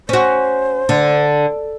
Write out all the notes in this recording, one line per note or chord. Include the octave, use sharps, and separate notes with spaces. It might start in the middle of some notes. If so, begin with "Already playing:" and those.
C#4 F#4 C5
D3